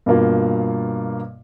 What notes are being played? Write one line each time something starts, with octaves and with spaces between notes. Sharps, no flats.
G2 B2 A#3 F4